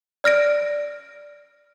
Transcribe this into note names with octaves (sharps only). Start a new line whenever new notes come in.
D5 F6 A#6 D7